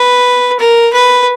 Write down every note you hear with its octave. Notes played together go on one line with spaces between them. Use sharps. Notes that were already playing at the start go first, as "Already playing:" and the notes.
Already playing: B4
A#4
B4